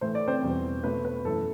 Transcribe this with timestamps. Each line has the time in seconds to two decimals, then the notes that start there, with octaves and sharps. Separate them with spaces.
0.01 A2 E3 A3 C5
0.15 D5
0.28 C4 C5
0.42 E2 B2 G3
0.84 B2 A3 B4
1.05 B4
1.25 F#2 E3 A3 A4